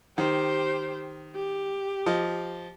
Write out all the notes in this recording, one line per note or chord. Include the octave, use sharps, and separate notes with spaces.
D#3 G4 C5
G4
F3 D#5